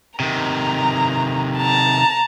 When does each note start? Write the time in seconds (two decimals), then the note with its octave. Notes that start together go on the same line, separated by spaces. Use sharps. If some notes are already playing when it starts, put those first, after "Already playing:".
0.20 C3 D#3 A#5
1.58 A5 A#5